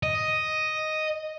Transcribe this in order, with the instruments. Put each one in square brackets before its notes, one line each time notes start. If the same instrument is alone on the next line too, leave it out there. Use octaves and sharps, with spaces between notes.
[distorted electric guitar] D#5